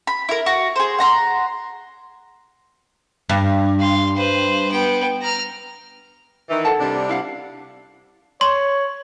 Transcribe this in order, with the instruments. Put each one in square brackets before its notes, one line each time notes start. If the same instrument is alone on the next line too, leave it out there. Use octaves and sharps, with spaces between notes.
[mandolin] B5
E4 A#4
F#4
G#4 C5
F#5 A#5 C6
[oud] G2
[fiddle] F5 C6
B4 C5
B3 G5
A#5 F6
[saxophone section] D#3 E3
[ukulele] A4 F#5 A5
[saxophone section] C3 G3 D4
[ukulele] E4 F5 F#5
[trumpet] C#5 [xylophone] C6